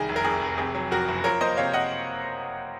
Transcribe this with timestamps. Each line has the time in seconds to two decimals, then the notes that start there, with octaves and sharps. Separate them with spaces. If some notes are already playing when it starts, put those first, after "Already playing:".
Already playing: C2 D#3 G#4
0.09 F1
0.16 A#4
0.25 F2 G#4
0.42 F1
0.58 C3 G#4
0.75 F#3
0.91 F2 F#4 A#4
1.08 F#1
1.24 F3 A#4 C#5
1.41 A#3 C5 D#5
1.57 C3 C#5 F5
1.74 D#5 F#5